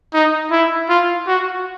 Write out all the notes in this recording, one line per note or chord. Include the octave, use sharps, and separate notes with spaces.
D#4
E4
F4
F#4